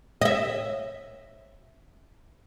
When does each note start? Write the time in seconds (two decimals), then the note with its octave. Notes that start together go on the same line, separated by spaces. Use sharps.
0.21 D#5 E5